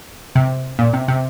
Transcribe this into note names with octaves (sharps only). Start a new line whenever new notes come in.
C3
A#2
C3
C3